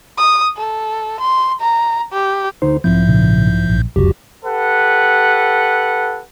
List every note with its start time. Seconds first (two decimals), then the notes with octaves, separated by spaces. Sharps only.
0.18 D#6
0.57 A4
1.20 C6
1.61 A#5
2.13 G4
2.62 D2 D#4 C5
2.84 B1 G#2 F3 C4 E4 G6
3.08 A#2 C#3
3.67 A#1
3.96 F1 C#2 F#2 F#4 G4
4.45 G4 A4 B4 F#5